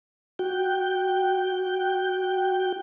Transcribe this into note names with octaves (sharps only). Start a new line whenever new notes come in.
F#4 G5